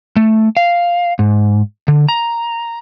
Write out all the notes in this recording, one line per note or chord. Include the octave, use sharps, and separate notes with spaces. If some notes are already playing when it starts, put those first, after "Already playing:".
A3
F5
G#2
D3
A#5